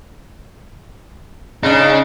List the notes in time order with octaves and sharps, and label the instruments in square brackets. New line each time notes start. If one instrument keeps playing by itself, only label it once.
[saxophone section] C#3 [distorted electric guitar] D4 [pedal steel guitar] D#4